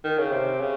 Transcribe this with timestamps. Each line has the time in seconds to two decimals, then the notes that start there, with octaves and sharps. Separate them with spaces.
0.04 D#3
0.18 C#3
0.32 C3
0.60 C#3